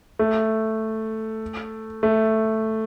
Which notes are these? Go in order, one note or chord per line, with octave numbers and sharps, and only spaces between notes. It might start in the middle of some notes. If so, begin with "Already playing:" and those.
A3
A3